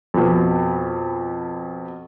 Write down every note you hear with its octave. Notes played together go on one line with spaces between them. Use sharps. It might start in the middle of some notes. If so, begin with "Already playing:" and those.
F2 B2